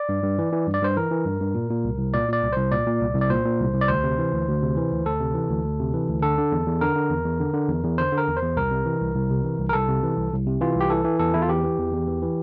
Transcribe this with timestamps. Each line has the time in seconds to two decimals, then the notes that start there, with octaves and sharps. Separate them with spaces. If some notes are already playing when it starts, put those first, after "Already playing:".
Already playing: D5
0.09 G2
0.23 G2
0.38 E3
0.53 E3
0.67 G2
0.74 D5
0.82 G2 C5
0.96 E3 A#4
1.11 E3
1.25 G2
1.40 G2
1.55 A#2
1.70 A#2
1.84 C2
1.98 C2
2.13 A#2 D5
2.28 A#2 D5
2.42 C2
2.53 C2 C5
2.72 A#2 D5
2.87 A#2
3.01 C2
3.15 C2
3.21 D5
3.30 A#2 C5
3.45 A#2
3.60 C2
3.74 C2
3.81 D5
3.88 D2 C5
4.03 C3
4.18 E3
4.32 D2
4.48 D2
4.62 C3
4.76 E3
4.92 D2
5.05 D2 A4
5.20 C3
5.34 E3
5.49 D2
5.64 D2
5.79 C3
5.94 E3
6.09 D2
6.22 D3 A4
6.38 D3
6.52 E2
6.66 E2
6.81 D3 A#4
6.96 D3
7.10 E2
7.25 E2
7.40 D3
7.54 D3
7.68 E2
7.84 E2
7.98 D3 C5
8.12 D3
8.18 A#4
8.27 E2
8.37 C5
8.42 E2
8.57 C2 A#4
8.71 C3
8.86 E3
9.00 C2
9.15 C2
9.30 C3
9.44 E3
9.59 C2
9.69 A#4
9.73 C2 A4
9.89 C3
10.03 E3
10.17 C2
10.32 C2
10.47 C3
10.61 E3 F4
10.76 C2 G4
10.90 E3 A4
11.05 E3
11.19 E2 A4
11.34 E2 E4
11.42 F4
11.48 E3 G4
11.63 E3
11.79 E2
11.93 E2
12.07 E3
12.22 E3